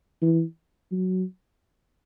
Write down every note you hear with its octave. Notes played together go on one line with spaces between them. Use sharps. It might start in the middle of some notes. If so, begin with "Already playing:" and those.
E3
F#3